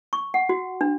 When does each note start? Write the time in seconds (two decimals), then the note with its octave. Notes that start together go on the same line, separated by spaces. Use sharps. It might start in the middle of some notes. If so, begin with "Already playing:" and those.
0.13 C#6
0.34 F#5
0.49 F#4
0.81 D4